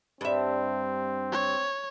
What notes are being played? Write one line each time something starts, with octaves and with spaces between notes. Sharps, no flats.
G2 C4 E5
C#5